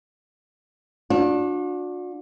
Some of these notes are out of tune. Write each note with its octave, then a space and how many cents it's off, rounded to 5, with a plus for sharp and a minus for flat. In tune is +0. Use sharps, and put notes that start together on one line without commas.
D4 +0 F#4 -45